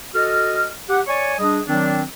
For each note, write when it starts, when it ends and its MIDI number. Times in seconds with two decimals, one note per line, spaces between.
0.15 0.69 66
0.15 0.69 69
0.15 0.69 75
0.15 0.69 89
0.88 1.00 67
0.88 1.00 78
1.07 1.34 73
1.07 1.34 74
1.07 1.34 80
1.07 1.34 85
1.39 1.59 55
1.39 1.59 62
1.39 1.59 68
1.39 1.59 75
1.68 2.02 51
1.68 2.02 54
1.68 2.02 60
1.68 2.02 62